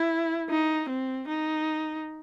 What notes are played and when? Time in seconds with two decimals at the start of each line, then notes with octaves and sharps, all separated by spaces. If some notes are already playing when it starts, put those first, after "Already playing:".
Already playing: E4
0.49 D#4
0.89 C4
1.28 D#4